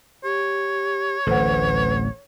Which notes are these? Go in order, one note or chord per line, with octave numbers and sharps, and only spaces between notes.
G4 C#5
D1 A1 A4 B4 C5 F#5